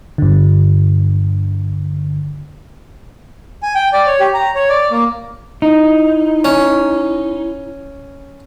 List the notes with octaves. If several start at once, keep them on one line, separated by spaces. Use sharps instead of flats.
G2 D3
G#5
G5
D5
C#5
G4
A#5
C#5
D5
A#3
D#4 E4
C#4